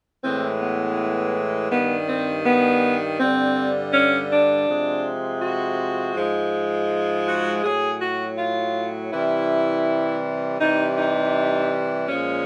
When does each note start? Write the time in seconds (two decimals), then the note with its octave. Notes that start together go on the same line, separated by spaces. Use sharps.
0.23 A2 E3 G#3 C4
0.61 B3
1.71 G2 D#3 G3 B3
2.09 C4
2.46 B3
3.19 G2 D3 G3 C4
3.93 C#4
4.30 D4
4.68 C3 F3 G#3
5.42 F#4
6.16 G#2 F3 G#3
7.27 F#4
7.64 A2 F#3 G#4
8.01 F#4
8.38 F4
9.12 C3 E3 G3 E4
10.60 C3 E3 G3 D#4
10.98 D#4
12.08 A#2 F3 G#3 C#4